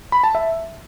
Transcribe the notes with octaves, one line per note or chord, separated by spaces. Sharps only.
B5
A5
E5